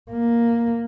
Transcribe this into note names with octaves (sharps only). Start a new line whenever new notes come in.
A#3